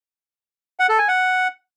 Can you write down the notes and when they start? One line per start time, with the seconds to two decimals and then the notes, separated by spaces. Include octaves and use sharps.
0.80 F#5
0.89 A4
0.99 G#5
1.08 F#5